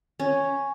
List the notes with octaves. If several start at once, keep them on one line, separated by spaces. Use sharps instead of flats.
C#4